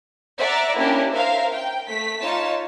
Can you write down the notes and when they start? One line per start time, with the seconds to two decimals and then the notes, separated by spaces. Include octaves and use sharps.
0.39 D5 E5 F#5 A#5
0.77 A#3 C#4 D4 E4 G4 A#4
1.12 A#4 C5 E5 F5
1.54 G5
1.88 A3 B6
2.20 D#4 F4 C#5 A5